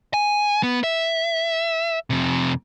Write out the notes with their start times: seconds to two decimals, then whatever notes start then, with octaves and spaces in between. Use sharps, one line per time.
0.14 G#5
0.63 B3
0.84 E5
2.10 F2 C3